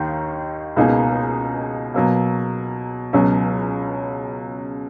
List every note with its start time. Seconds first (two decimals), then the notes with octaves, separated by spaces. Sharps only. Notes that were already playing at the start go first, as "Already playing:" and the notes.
Already playing: D#2 D#3 A#3 D#4
0.76 C#2 B2 A#3 D#4 G#4
1.94 B2 F#3 A#3
3.13 C#2 B2 F#3 C#4